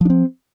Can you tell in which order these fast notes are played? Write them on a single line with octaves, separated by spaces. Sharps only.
F3 D4 C4